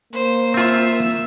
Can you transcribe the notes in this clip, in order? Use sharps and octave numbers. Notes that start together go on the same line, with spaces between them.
A#3 C5
C4 F4 E5 E6